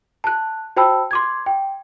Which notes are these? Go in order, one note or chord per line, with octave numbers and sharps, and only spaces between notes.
A5 F#6
F#4 C5 G5 A5 B5 E6
C6 D6 G#6
G5